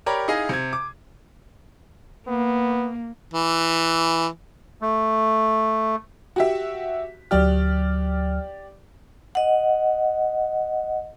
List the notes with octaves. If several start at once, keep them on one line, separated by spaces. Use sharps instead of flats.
G4 A#4 C#5 D5 A#5 B5
D#4 E4 G#4 D#5 F5
C3 G#6
D6
A#3 B3
E3
A3
F#4 G4 E5
D2 F#3 G4 D5 F6
D#5 F#5